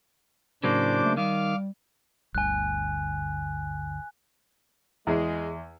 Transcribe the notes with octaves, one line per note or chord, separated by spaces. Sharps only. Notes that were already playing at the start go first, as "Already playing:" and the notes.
A2 C#3 F#3 A#3 D4 C5 D6
A3
D#3 G3 F5 D6 F6
G1 D2 G2 G#5 F#6
E2 G#3